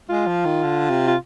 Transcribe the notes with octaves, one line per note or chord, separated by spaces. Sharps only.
G#3 F4
F3
D#3
D3
C3
F4